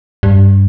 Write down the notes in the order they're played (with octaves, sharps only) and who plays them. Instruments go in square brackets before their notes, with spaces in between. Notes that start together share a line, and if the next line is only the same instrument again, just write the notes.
[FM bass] G2